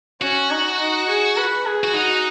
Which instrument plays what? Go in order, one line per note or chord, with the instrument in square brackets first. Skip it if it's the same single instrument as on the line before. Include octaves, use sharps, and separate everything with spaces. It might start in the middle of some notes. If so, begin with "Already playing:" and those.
[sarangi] C#4 [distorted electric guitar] F#4
[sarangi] D#4
D#4
G#4
B4
G#4
[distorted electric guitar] F#4
[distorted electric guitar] D#4 [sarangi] F#4